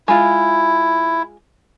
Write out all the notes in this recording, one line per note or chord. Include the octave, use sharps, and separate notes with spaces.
G#3 E4 F4